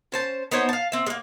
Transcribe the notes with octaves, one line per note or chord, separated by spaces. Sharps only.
C#4 C5 A5
B3 D#4 C5 C#5
F5 A5
C4 E5
G#3 A#3